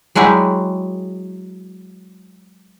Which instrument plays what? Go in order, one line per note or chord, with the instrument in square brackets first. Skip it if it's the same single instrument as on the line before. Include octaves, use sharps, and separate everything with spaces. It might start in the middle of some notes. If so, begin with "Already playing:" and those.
[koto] F#3 G#3 E4 F#4 G4